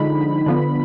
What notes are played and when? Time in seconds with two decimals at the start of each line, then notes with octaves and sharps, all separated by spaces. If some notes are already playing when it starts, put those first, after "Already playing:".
Already playing: D3 F3 G#3 D#4 B5
0.46 D3 F3 B3